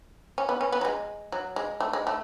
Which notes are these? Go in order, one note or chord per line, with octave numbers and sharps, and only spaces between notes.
C#4
B3
C#4
B3
F#3
G#3
F#3
G#3
A3
G#3
A3